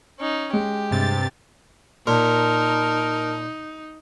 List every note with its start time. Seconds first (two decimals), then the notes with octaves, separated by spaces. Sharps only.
0.19 C#4 D#4
0.53 G#3 G4
0.91 G2 C3 A6
2.07 A#2 D#4 A#4 A5